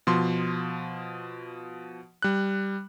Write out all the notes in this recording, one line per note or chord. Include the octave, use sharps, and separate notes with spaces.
B2 F3 C6
G3 F#6